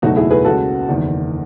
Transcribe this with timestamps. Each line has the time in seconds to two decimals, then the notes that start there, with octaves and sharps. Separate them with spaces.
0.02 F#1 E2 B2 F#3 A3 D#4 F#4
0.16 E4 G#4
0.30 G#4 B4
0.45 C#2 C#3 G#3 F#4 A4
0.89 F#1 E2 D#3